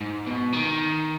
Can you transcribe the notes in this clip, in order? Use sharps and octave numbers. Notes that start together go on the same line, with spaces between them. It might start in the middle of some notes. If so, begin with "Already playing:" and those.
G#2
B2
D#3